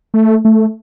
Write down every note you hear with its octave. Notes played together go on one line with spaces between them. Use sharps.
A3
A3